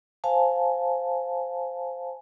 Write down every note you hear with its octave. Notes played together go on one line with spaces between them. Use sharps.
C5 F5 G#5 A5